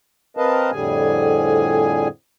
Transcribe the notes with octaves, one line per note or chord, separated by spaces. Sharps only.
C4 A#4 B4 D#5 F5 A5
F2 A2 D3 G3 G#4 G#5